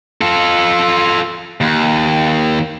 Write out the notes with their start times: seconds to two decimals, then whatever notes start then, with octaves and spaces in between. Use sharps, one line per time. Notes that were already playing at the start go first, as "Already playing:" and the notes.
0.21 F4 A4
1.61 D#2